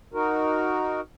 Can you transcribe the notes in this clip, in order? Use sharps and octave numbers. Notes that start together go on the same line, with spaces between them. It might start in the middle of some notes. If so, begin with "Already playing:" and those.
D#4 F#4 A#4